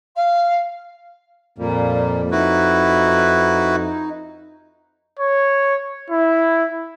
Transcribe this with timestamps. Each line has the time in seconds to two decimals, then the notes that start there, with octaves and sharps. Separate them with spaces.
0.16 F5
1.58 F2 A#2 G3 A#3
2.31 D#4 E4 F#4 B4
5.20 C#5
6.10 E4